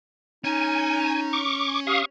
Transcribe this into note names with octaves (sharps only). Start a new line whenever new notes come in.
C#4 D#4 G#5
C#6 D6
G4 F5 C#6 D#6